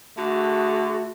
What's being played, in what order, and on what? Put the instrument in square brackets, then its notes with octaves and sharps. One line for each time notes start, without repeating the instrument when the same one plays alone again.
[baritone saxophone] D3 [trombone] A3 [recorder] F#4 [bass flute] G#4